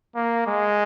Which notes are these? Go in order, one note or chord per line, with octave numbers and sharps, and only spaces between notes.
A#3
G#3